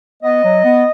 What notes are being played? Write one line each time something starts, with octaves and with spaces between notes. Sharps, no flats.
B3 D#5
F#3
B3